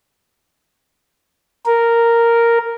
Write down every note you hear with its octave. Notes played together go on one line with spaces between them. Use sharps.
A#4